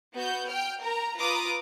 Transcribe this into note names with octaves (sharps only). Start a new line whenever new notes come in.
B3 F#4 G6
G5 F6
A#4 A#5
F4 B4 A#5 D6 D#6